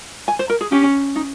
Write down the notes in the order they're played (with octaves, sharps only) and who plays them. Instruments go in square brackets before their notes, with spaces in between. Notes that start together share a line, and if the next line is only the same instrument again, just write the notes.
[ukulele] G#5
C5
A#4
G#4
[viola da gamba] C#4 [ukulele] G4
[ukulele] D#4